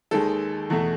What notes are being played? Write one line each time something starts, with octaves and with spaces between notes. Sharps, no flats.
D#2 D#3 G#3 A4
E2 B2 A3